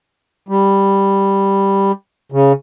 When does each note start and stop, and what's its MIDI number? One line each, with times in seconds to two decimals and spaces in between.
0.48 1.92 55
2.32 2.52 49